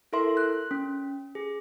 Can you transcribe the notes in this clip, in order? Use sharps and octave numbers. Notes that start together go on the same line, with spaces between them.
E4 A4 A#4 E5 C6
F#6
C#4
G#4